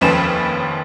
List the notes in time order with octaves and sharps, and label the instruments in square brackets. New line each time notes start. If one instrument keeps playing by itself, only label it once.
[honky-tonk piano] F1 D#2 F3 C#4 B4 E7